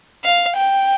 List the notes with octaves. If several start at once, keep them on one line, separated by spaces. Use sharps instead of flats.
F5
G5